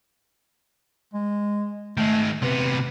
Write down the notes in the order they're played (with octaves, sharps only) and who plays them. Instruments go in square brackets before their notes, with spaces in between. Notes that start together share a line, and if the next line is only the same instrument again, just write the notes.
[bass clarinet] G#3
[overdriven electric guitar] D#3 G#3 [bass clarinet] A3
[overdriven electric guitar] C3 B3 [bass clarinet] B4